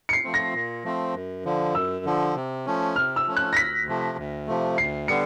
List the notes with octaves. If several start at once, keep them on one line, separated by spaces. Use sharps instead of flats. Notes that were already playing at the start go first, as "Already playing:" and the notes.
C#7
C7
F3 A3 C4
A#6
A#2
F3 A3 C4
F#2
D3 F3
F#2 E6
D3 F3
C3
F3 A3 C#4
C3 F6
E6
F3 A3 C#4
F#6
A#6
D2 B6
C3 F3 A3
D2
C3 F3 A3
D2 C7
D3 G3 B3 C#7